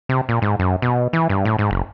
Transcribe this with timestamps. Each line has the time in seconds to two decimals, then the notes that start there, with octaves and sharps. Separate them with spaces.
0.09 C3
0.29 A#2
0.42 G#2
0.59 F#2
0.82 B2
1.13 E3
1.29 G2
1.45 A2
1.59 G#2
1.71 F#1